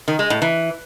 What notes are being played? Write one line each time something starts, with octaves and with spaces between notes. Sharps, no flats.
D#3
G#3
A2
E3